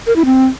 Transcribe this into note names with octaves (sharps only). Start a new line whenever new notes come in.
A#4
E4
C4